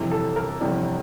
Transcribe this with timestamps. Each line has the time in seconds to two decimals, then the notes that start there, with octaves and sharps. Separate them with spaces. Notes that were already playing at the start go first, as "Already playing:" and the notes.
Already playing: G1 F2 C3 E3
0.11 A4
0.36 A#4
0.61 G1 F2 C3 E3 D5